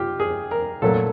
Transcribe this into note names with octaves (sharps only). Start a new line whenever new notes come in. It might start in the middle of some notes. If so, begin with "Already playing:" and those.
Already playing: F4 G4
G#4
A#4
A#2 F#3 A3 A4